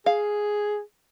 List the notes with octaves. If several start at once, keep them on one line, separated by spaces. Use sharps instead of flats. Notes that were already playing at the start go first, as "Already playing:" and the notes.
G#4 F5